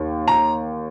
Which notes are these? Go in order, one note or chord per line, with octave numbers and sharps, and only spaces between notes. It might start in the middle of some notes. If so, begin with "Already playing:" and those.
Already playing: D#2 D#3
A#5